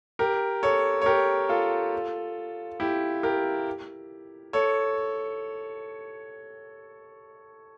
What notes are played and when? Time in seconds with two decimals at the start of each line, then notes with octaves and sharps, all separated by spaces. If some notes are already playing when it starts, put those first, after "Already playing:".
0.19 G4 A#4
0.63 A4 C#5
1.02 C#5
1.06 G4 A#4
1.49 F4 A4
2.80 E4 G4
3.23 G4 A#4
4.53 A4 C#5